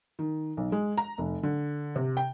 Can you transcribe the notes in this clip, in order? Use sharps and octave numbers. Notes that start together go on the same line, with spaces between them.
D#3
B1
G#3
A#5
F1
D3
C3
G5